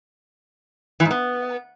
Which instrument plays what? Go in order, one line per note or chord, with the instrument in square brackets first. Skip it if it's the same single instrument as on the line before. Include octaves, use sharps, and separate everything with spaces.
[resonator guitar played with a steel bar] E3
G#2
B3